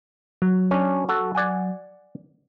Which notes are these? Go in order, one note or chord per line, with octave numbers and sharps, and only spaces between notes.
F#3
C#4 D4
F#4 A4
D5 F#5 G#5